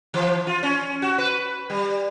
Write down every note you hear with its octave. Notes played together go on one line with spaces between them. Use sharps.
E3
F4
C#4
F#4
B4
G3